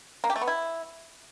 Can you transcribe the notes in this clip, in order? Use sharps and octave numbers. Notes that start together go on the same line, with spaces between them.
A#3
G4
A3
B3
E4